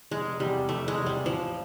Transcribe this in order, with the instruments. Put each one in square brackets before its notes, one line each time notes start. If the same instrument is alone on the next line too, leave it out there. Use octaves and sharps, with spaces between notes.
[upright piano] F1 [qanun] G#3
[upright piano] E2 C3 [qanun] G3
[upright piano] F1 [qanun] A3
[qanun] G#3
[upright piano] E2 C3
[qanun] G3
[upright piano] A1 [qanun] F3